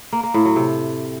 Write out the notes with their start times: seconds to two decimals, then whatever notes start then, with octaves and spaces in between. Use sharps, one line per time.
0.13 A#3
0.23 A#3
0.34 A2
0.45 F#3
0.56 C3